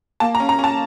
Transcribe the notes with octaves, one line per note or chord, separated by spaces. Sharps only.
A#3 A5
A#5
C#4
A#5
C#4
A5